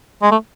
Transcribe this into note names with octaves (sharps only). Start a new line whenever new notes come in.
G#3
A3